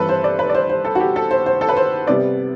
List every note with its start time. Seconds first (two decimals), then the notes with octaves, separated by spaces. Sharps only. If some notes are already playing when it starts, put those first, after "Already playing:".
Already playing: G2 E3 G3 C4 A4 B4
0.09 C5
0.24 D5
0.39 B4
0.49 D5
0.55 C5
0.69 C5
0.85 A4
0.95 F#4
1.00 G4
1.16 A4
1.31 C5
1.46 C5
1.61 A4
1.69 B4
1.77 C5
2.07 C3 G3 B3 D5